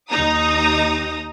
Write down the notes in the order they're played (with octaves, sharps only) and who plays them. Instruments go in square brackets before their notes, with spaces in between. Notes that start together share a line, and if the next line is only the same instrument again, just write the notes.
[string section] D#2 D#4 A#5 D#6